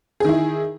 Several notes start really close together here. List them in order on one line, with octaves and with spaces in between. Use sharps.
G#4 D#3 E4